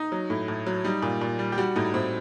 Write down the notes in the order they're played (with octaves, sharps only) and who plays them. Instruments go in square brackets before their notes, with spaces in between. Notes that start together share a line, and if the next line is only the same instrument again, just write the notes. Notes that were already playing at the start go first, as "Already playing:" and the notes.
Already playing: [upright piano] D#4
F#3
A2
A2
F#3
G3 D#4
A#2
A#2
G3
G4
G3 F#4
A2 D#4
A2 C4